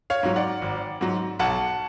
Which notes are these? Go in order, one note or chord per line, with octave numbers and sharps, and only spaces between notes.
C#5 F5
G#2 F#3
D5 F#5
G#1
G#2 F#3
B1 F#5 A5